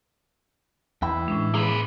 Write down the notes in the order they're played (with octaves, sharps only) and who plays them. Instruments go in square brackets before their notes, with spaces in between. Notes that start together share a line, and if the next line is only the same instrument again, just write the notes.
[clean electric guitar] E2 G5 B5 [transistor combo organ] E3
[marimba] A2 C#4 D4 [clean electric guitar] G#3
[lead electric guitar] A#3 B4 [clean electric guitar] G#4